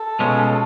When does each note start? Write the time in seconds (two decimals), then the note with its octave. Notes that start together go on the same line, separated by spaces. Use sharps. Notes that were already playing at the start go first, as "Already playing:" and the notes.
Already playing: A4
0.19 B2 G#3 C#4 F4